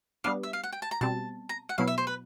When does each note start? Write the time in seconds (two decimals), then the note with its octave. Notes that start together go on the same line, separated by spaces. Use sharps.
0.24 G3 B3 D4 F5
0.43 E5
0.53 F5
0.63 F#5
0.72 G5
0.82 A5
0.91 A#5
1.01 B2 G3 C4 A5
1.49 A#5
1.69 F#5
1.78 B2 F#3 B3 E4 F5
1.87 E5
1.98 C5
2.07 B4